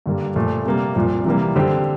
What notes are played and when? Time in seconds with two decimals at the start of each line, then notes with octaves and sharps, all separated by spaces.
0.06 G2 D3 G3 A#3
0.36 A#2 F3 A3
0.65 C3 G3 A#3
0.95 C2 A#2 F3
1.25 C3 E3 G3 A#3
1.55 D3 G3 C4 G4